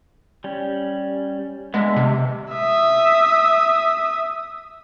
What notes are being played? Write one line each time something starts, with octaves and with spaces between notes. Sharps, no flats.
G3 C#4
G#3 B3 D4 E5
C3
E5 D#6